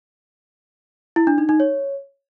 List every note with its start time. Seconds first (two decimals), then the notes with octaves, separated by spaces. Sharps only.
1.16 E4
1.27 D4
1.38 D#4
1.49 D#4
1.60 C#5